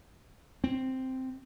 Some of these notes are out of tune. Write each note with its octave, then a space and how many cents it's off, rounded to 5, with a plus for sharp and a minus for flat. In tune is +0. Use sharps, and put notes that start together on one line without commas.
C4 -5